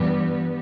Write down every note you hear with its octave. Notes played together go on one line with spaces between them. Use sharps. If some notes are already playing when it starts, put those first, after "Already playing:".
Already playing: G2 E3 G3 B3